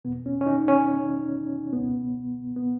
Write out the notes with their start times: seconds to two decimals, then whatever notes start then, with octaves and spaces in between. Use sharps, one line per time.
0.05 B2 B3
0.08 E2
0.26 C#4
0.41 C#4
0.46 D#4
0.68 C#4
1.73 C#2 B2 B3
2.56 B3